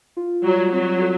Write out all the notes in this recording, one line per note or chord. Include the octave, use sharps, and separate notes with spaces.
F4
F#3 G3
F#3 C4
A4